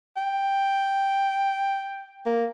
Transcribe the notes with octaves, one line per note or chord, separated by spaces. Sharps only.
G5
A#3